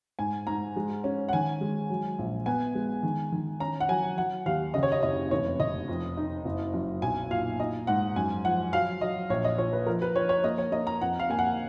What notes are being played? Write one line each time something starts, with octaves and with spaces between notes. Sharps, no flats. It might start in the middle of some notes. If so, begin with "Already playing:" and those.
G#2 G#5
G#2 A#5
G#3
C#4
F#5
D#3 G#5
G#3
F#3
A#1
B3 G#5
G#3
D#3
D#3
C#4 A#5
F#5
F#3 G#5
F#3 F#5
D#2 F5
C#3 D#5
C#5
D#5
F#1 D#5
F1 C#5
F1 D#5
F2
D#4
F#1
F#2
B1 G#5
A#2 F5
D#4 D#5
G#2 F#5
F#2 G#5
F3 F#5
F#3 F5
F#3 D#5
A#1 C#5
D#5
A#2 C#5
B4
F3 A#4
B4
F3 C#5
C#5
A#3 D#5
C#5
A#3 D#5
A#5
F2 F#5
F5
A#3 G#5
F#5